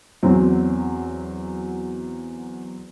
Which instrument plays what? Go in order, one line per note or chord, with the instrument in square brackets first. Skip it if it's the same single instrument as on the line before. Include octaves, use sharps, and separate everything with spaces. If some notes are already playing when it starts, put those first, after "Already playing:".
[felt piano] E2 F#3 C4